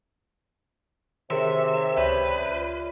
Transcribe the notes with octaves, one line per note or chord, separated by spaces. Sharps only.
C3 D#3 G#4 A#4 C#5 E5 C6
C#2 B4 C#5 D5 E5
F4